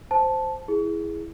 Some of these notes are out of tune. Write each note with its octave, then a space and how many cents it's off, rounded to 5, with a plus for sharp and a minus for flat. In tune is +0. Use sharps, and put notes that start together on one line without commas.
C5 -5 A5 -5
E4 +0 G#4 +0